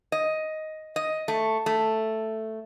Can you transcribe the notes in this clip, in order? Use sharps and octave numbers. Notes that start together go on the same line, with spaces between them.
D#5
D#5
A3
A3